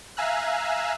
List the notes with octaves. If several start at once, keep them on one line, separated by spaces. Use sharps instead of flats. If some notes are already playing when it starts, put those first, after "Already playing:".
E5 F5 G#5 A#5 E6 F#6